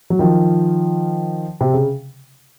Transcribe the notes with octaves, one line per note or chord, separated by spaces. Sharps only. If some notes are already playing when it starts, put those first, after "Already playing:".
F#3
D#3 F3
C3
C#3